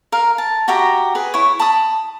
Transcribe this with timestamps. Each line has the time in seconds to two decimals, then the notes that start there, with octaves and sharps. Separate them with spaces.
0.12 A#4 F5
0.38 A5
0.68 F#4 G4 E5 A#5
1.15 G#4 B4
1.34 E4 C#5
1.60 A5 B5 D#6